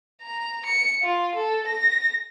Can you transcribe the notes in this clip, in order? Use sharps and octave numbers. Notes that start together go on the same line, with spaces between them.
A#5
C#7
F4
A4
A#6